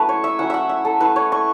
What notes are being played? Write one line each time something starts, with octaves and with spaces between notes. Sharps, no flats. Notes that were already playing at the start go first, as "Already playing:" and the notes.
Already playing: F#3 A3 C#4 E4 B4 A5
C#5
E5
F#3 C#4 E4 F#5
E5 F#5
E5
A4
A3 E4 B4
C#5
C#6